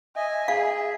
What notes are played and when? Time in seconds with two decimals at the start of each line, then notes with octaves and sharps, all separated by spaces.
0.16 D#5 E5 G#5
0.48 G#4 F5